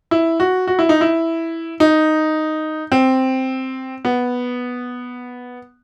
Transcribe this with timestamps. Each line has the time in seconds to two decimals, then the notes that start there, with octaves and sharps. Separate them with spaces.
0.11 E4
0.40 F#4
0.67 F#4
0.79 E4
0.89 D#4
1.01 E4
1.80 D#4
2.92 C4
4.05 B3